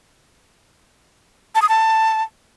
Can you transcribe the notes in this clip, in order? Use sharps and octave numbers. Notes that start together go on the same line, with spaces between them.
A5
D#6
A5